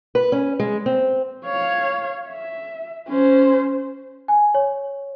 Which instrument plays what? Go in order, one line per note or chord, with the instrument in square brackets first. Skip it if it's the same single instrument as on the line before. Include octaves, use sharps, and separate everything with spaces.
[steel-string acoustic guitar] B4
C#4
G#3
C4
[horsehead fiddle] C#5 F5
E5
C#4 C5
[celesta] G#5
C#5